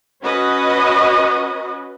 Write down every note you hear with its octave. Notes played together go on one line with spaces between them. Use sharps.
C#4 F#4 B4 D#5